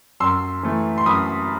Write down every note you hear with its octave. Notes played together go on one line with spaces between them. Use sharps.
F#2 C6 E6
E3 A3
C6
F#2 B5 D#6